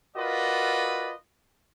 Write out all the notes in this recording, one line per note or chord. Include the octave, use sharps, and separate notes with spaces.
F4 F#4 A#4 B4 D5 D#5